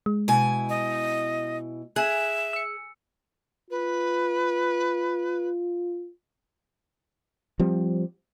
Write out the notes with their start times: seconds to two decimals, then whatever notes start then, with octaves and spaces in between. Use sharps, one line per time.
0.06 G#3
0.28 B2 E4 G#5
0.69 D#5
1.96 G#4 E5 G#5 F#6
2.53 E6 C#7
3.70 F4 B4
7.60 F3 G3 C4